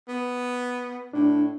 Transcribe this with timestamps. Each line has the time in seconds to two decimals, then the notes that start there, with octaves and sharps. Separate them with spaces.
0.08 B3
1.13 A2 D4